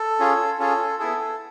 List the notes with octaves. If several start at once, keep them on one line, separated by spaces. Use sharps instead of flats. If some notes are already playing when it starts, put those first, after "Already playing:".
Already playing: A4
C#4 F4 G#4
C#4 F4 G#4 A4
B3 E4 G#4 A4